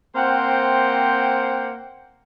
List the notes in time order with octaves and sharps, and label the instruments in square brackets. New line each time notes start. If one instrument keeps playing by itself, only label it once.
[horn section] A#3 C4 C5 F#5 G5